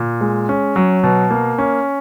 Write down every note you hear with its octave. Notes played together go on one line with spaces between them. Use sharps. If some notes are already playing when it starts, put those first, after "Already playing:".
Already playing: A#2
G#3
C#4
F#3
B2
A#3
C#4